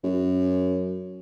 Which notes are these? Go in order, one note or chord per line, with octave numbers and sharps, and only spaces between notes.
F#2